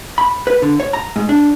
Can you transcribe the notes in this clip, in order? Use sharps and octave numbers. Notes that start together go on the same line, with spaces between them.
B5
B4
D3
C#5
A#5
G#2
D4